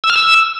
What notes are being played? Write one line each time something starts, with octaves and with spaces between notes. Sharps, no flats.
E6
F6
E6